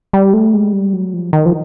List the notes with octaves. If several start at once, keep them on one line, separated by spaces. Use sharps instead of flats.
G3
A3
G#3
G3
F#3
F3
D#3
F3